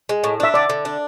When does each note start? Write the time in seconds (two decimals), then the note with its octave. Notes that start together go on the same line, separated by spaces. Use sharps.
0.09 G#3
0.24 A2
0.40 D4 E5
0.54 D3 D5
0.70 D3
0.85 D4